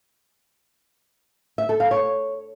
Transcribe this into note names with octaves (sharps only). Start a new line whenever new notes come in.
E5
A4
F5
C#5